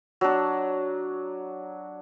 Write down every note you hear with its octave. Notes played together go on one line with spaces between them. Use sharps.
F#3 D4